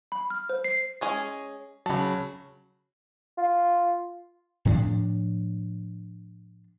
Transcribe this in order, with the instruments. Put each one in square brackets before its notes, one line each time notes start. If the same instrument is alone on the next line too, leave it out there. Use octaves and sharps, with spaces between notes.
[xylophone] B5
F6
C5
C7
[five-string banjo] G#3 C#4 G#4
[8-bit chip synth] C#3 F#3 [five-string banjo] A5 B5
[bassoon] F4
[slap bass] A2 F3 C4 D4